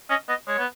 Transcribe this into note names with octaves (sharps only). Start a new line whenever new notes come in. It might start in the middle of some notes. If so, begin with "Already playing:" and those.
C#4 D#5
B3 D#5
G#3 C#5
B3